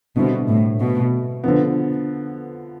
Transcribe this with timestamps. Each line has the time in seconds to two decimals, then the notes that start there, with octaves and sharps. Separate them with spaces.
0.16 B2 D3 G3 C4 E4
0.49 A2
0.80 B2
1.44 D3 F3 B3